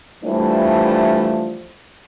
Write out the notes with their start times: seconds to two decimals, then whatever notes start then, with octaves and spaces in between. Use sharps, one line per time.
0.23 E3 F3 G3 A3 D4 E4